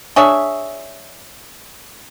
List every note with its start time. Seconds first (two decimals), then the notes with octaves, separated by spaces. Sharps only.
0.16 D4 G#4 C#5 E5